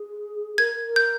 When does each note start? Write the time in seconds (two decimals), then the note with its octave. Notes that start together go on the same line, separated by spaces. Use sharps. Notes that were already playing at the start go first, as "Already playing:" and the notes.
Already playing: G#4
0.57 A#4 G#6
0.82 A#4
0.96 G6